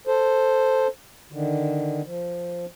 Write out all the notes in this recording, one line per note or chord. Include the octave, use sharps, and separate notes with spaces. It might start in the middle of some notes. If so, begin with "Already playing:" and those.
A4 C5
D3 D#3
F3